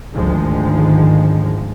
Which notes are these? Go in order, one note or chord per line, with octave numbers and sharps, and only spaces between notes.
G#1 D2 D#3 F3 G#3